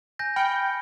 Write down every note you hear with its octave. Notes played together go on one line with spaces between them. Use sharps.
G#5 G6 A#6
G5 B5 F6 C#7